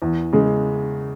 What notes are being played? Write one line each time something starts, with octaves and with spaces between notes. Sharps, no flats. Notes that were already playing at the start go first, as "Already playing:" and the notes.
E2
C#3 G#3